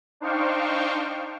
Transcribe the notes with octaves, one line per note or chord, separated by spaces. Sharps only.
D4 D#4 C5 F5 G5 C#6